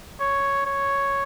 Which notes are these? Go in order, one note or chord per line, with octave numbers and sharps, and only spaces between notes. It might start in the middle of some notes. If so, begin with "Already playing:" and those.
C#5
C#5